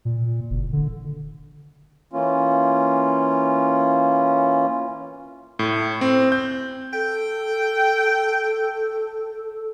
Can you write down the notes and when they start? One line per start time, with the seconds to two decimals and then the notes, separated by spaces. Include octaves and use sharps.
0.05 A#2
0.50 F#1
0.73 D3
2.13 E3 A#3 C#4 F4
5.59 A2
6.01 C4
6.32 G6
6.93 A4 G5